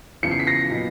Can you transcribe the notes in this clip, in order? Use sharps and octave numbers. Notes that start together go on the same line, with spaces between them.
E2 C#3 F3 C#7
C7
B6
A#6 C7
A#2 F#3 B3 D#4